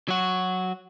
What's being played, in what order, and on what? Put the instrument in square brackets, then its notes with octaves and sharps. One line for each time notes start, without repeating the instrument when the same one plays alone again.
[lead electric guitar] F#3 F#4